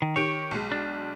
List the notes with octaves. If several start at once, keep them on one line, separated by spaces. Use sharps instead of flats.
D#3
D#3 G4 C#5 D7
B1 G#3
D4